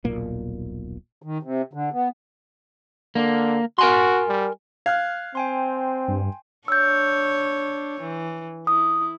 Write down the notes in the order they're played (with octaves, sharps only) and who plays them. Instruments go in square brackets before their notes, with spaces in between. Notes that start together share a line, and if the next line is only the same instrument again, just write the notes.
[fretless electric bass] D#1 B1 A#2 A#3
[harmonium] D#3
C3
D3
B3
[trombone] D3 [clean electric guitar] A#3
[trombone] F#4 [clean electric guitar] A#4 G#5 C6
[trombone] G3
[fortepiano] F5 [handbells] F6 F#6 G#6
[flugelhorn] C4 [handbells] G5 G#5 C6
[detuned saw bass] G2
[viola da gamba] D4 C#5 [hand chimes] E6 G6
[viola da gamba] E3
[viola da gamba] E4 [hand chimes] D#6